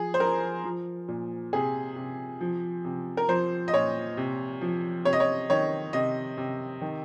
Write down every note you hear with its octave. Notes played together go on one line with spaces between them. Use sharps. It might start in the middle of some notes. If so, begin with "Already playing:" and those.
Already playing: F3 G#4
C5
F3 A#4
F3
A#2
C3 G#4
C3
F3
C3
A#4
F3 C5
D#5
A#2 C#5
C3
F3
C3 C#5
D#5
C#5
D#3 C#5
C3 D#5
C3
D#3